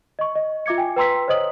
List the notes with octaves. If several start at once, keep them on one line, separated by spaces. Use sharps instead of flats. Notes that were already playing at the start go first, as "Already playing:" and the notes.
D#5 C#6
D#5
F4 E5 D6 G#6 C#7
G5 G#5
B4 G5 A#5 C6 E6 B6
C5 C#5 D#5 D#6 F#7